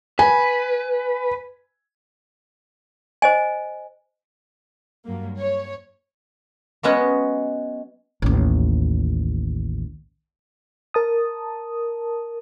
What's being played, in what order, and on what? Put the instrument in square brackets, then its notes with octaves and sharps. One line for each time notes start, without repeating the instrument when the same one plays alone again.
[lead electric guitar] B4 [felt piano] G#5
[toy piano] C5 D#5 G#5
[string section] G2 F#3 A#3
C#5
[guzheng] F#3 G#3 B3 C#4 D#5 F#5
[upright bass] A1 D#2
[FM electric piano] A#4 A5 D#6